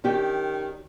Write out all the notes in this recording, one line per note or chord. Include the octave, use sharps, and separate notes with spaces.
D#3 C#4 D4 G4